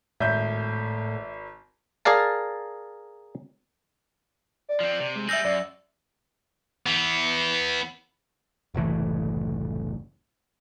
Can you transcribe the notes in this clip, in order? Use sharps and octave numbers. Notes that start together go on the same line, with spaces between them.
G#1 A2 E5 G6
G#4 A#4 D5 F5 A5
D5
F3 C4
C3
G#3
G3 G#4 E5 E6 G6 A#6
F#2 D5
E3 B3
F#1 C2 A2 E3